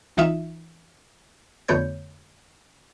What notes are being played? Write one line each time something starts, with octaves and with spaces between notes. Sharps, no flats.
C2 E3 D#4 F4 E5
F2 D3 A3 B3 C#5 G6